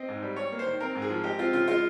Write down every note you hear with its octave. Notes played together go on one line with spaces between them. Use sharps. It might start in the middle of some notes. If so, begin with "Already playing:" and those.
Already playing: C4 D#5
G#2
G3
G3 C#5
A#3
C5
D#3
C4 A#4
G#2
G#4
F3
G#3 G4
C4 F4
C#3 F4
G#3 F4